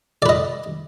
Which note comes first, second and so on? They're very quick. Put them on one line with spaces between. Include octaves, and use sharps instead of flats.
D5 B4 D#5